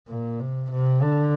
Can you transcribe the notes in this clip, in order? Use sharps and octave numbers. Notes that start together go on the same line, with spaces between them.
A#2
C3
C3
D3